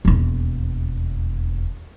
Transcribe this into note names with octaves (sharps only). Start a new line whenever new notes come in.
E1 D#2